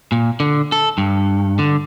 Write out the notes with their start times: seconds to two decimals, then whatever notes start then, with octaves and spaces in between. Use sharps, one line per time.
0.12 A#2
0.40 D3
0.72 A4
0.98 G2
1.59 D3